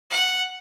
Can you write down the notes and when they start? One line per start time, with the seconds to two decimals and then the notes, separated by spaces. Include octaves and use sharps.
0.10 F#5